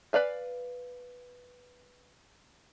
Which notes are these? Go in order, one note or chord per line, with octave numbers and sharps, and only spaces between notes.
B4 D5 F5 G#5